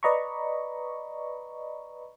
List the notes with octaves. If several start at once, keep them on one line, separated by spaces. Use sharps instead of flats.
B4 D5 D#5 A#5 B5 C#6